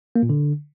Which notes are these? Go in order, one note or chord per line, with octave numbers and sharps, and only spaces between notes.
A#3
A#2
D3